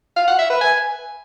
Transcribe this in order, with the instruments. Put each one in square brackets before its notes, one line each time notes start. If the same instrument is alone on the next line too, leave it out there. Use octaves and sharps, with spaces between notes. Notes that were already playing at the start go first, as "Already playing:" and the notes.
[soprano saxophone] F5
F#5
E5
B4
G#5